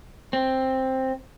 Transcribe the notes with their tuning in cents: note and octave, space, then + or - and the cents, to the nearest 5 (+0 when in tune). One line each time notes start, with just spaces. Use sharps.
C4 +5